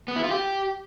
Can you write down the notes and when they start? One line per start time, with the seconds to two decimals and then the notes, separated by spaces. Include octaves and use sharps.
0.08 B3
0.16 E4
0.23 F4
0.31 G4